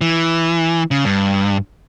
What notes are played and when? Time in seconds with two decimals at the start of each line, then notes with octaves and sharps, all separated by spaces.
0.01 E3
0.91 C#3
1.05 G2